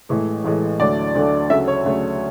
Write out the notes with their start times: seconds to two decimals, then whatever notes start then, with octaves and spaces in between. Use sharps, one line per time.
0.09 A1 A2 E3 G#3
0.44 A1 A2 E3 G#3
0.80 D2 D3 F#3 A3 D5
1.15 D2 D3 F#3 A3
1.50 D2 C#3 F#3 A3 E5
1.68 C#5
1.85 D2 C#3 F#3 A3